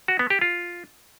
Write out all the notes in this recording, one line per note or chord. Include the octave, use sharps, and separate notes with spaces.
F#4
B3
G4
F4